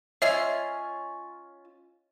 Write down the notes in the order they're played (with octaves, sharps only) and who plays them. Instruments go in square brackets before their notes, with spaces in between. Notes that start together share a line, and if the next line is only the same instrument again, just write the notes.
[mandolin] C#4 F4 G#5 [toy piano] C#5 D#5 E6 [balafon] E5